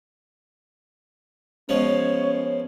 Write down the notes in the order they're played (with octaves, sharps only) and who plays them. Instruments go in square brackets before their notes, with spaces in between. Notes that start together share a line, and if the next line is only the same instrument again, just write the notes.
[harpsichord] B2 F3 G#3 [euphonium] C#4 [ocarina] C#5